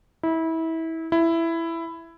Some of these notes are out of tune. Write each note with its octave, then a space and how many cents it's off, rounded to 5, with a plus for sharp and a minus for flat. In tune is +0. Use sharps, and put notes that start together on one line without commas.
E4 -25
E4 +10